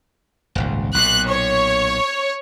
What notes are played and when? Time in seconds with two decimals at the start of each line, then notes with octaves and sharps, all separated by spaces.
0.55 D#1 G#1 C#2
0.94 B1 A#2 F#6
1.29 C#5